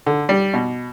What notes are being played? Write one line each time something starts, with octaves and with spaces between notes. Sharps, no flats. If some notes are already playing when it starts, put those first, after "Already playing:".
D3
G3
B2